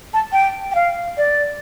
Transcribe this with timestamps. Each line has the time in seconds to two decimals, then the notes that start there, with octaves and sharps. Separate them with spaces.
0.14 A5
0.32 G5
0.71 G5
0.75 F5
1.17 D5